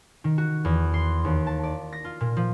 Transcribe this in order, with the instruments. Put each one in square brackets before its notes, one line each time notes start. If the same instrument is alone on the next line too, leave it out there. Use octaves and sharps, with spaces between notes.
[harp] D#3
F#4
E2
C6
D#2
A5
D5
A#6
F4
A#2
F3